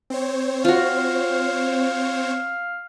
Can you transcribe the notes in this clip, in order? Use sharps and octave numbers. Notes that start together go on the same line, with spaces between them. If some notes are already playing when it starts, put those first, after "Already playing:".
C4 C5 C#5
F4 F#4 F5